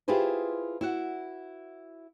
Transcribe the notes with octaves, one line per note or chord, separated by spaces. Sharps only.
E4 F4 G4 G#4 B4 C5
E4 F#4 F#5